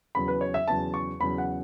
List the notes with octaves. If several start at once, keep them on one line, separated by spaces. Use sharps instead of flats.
E2 C#3 F#3 B5
B4
C#5
E5
E2 C#3 F#3 A5
C#6
E2 C#3 F#3 B5
F#5